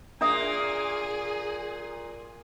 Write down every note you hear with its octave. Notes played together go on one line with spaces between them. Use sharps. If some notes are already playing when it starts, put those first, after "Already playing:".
A#2 A#3 D4 G#4 E5 D#6